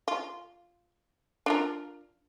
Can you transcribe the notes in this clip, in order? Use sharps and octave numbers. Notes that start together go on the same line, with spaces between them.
F4
D4 F4 A#4